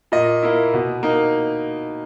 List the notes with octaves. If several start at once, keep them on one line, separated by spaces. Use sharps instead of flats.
A#2 D#5
A#3 E4
B2
A#3 D#4